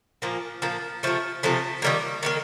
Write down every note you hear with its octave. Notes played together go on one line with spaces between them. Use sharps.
A#2 F3 A#3
A#2 F3 A#3
C3 F3 A3
C3 F3 A3
D#3 G3 A#3
D#3 G3 A#3